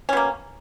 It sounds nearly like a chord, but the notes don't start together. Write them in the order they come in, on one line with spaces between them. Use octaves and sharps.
C#4 B2 A#3